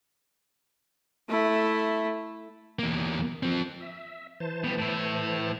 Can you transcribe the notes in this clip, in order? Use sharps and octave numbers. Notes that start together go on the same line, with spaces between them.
A3 E4
E2 A#3
F3 C4
E5
E3 C5 A5
B2 G3
A2 E4